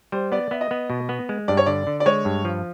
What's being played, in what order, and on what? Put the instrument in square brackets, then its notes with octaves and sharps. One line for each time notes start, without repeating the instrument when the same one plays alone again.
[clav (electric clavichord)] G3 [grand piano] C5
[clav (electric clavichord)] B3 [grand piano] D5
[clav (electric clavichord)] B3 [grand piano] E5
[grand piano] D#5
[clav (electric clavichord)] B3
B2
B3
G#3
[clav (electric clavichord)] G2 [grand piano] D5
[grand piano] C#5
[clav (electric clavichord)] D3 [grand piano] D5
[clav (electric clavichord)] D3
[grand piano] D5
[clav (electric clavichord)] G#3 [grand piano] C#5
[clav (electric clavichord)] G2
F3